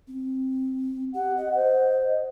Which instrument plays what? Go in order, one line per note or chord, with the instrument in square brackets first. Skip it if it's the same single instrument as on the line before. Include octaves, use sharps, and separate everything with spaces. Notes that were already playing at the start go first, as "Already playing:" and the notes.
[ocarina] C4
[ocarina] G4 [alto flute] F#5
[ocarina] D#5
[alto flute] C5